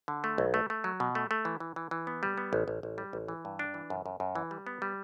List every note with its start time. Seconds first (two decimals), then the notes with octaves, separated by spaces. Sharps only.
0.08 D3
0.24 A3
0.38 B1
0.54 A3
0.70 A3
0.84 F#3
1.00 B2
1.15 A3
1.31 A3
1.45 E3
1.60 E3
1.76 E3
1.91 E3
2.07 B3
2.23 G3
2.38 B3
2.53 A1
2.68 A1
2.83 A1
2.98 G3
3.13 A1
3.28 E3
3.45 G2
3.59 D4
3.74 E3
3.90 F#2
4.06 F#2
4.20 F#2
4.35 E3
4.51 G3
4.67 B3
4.82 G3